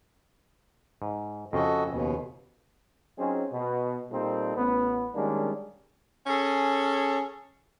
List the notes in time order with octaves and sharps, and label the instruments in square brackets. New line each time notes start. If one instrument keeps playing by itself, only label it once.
[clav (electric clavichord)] G#2
[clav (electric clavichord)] F2 C#3 [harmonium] F#4 A4 D#5
[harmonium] D#2 B2
[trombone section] F#3 C4 C#4 D#4 F4 G#4
B2
A#2 G3 A#3 C4 D#4 A4
A1 B3
D#3 G3 G#3 A#3 C#4 D4
[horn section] C#4 G#4 A4